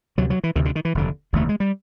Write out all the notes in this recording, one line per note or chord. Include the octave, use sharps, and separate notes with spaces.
D2 C3 F#3
F#3
E3
D2 C3 D#3
D3
D#3
E3
F1 D#2 D3
F1 D#2 D3 A3
G#3
G3